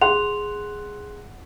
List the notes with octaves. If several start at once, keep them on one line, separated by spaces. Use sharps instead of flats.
G#4 F#5 C6 F7